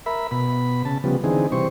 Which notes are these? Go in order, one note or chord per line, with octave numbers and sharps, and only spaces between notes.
A#4 E5 B5
B2 B5
C#3 A5
C#3 F3 G3 B3
D3 E3 C4 D#4 G#4
C3 E3 G3 C5 C#6